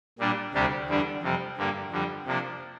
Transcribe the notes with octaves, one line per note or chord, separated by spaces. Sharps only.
A#2 G3 D4
D2 C3 G3 D4 G4
E2 D3 G3 D4
F2 C3 G3
G2 D3 G3 A#3
F2 D3 G3
C3 F3 A#3 D4